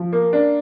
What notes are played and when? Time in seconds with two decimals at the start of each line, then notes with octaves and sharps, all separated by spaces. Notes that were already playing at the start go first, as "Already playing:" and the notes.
Already playing: F3
0.13 A#3
0.33 D4